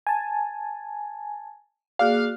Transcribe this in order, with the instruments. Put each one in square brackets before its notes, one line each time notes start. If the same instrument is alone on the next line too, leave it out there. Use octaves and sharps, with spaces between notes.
[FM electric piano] G#5 A5
[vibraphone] A#3 F#4 G#4 [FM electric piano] D5 F6 F#6 [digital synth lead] F5